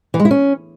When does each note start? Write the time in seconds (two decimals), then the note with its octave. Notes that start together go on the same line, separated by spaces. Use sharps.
0.14 E3
0.19 G#3
0.25 E4
0.31 C#4